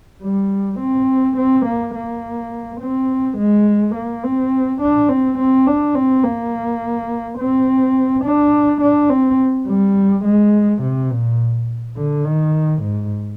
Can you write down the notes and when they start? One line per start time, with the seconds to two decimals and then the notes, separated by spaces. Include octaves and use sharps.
0.23 G3
0.80 C4
1.37 C4
1.66 A#3
1.95 A#3
2.81 C4
3.38 G#3
3.95 A#3
4.23 C4
4.81 D4
5.09 C4
5.38 C4
5.67 D4
5.95 C4
6.24 A#3
7.38 C4
8.25 D4
8.81 D4
9.10 C4
9.67 G3
10.25 G#3
10.82 C3
11.11 A#2
11.97 D3
12.25 D#3
12.82 G#2